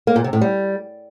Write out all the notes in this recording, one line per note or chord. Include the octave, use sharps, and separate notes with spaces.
A#3
A#2
C3
A2
G3